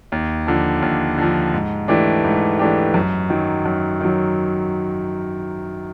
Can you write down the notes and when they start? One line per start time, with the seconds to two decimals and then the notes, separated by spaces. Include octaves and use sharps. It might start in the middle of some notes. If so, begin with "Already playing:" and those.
0.12 D#2
0.47 D3 F3
0.82 D#2
1.18 D3 F3
1.54 G#2
1.88 E3 A3 D4 G4
2.25 G#2
2.59 E3 A3 D4 G4
2.94 F#2
3.30 D#3 F#3
3.66 F#2
4.01 D#3 F#3